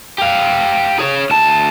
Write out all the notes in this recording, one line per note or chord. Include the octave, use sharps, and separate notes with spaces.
G4 F5
G#4 C#5
D2 A5